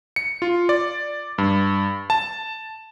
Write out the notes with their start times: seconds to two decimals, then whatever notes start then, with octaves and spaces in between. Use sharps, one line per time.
0.16 C#7
0.42 F4
0.69 D5
1.38 G2
2.10 A5